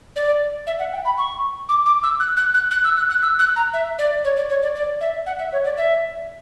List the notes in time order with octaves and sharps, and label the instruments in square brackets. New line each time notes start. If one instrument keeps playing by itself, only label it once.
[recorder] D5
E5
F#5
G5
B5
C#6
D6
D6
E6
F#6
F#6
F#6
F#6
E6
F#6
F#6
E6
F#6
A#5
E5
D5
C#5
D5
C#5
D5
D5
E5
F#5
E5
C#5
D5
E5